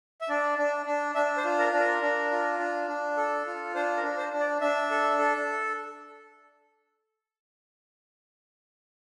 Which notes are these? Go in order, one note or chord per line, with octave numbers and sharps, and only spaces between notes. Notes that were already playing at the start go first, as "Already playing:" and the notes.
E5
D4 D5
D4
D4
D4 E5
C5
F4
A#4
D4
A#4
D4
F4
D4
D4
A4
F4
D4 C5
A#4
D4
C5
D4
D5
D4 E5
A4
A4